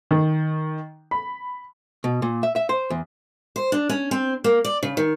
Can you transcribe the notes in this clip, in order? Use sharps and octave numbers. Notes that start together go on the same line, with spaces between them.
D#3
B5
B2
A#2
E5
E5
C5
E2
C5
D4
C#4
C4
A#3
D5
C#3
D#3